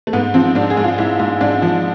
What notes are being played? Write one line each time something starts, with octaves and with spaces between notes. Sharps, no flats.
A3
G#2 B3
F3 C4
G#2 D4
G#4
G#2
F4
G#2 E4
G#2
G#2 D4
F3